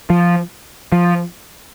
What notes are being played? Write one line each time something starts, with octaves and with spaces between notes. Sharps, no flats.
F3
F3